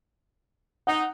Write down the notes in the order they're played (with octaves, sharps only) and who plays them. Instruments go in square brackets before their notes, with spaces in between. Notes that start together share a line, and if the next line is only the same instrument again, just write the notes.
[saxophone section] D#4 [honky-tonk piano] F#5